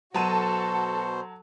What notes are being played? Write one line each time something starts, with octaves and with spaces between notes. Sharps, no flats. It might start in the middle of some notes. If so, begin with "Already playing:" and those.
B2 F#3 F#4 A4 C5 A5 D#7